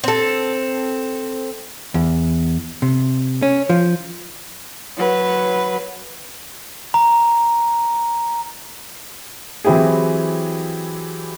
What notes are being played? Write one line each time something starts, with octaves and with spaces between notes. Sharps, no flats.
C4 A4
E2
C3
C#4
F3
F#3 B4
A#5
E3 F#3 C4 E4 G4 G#4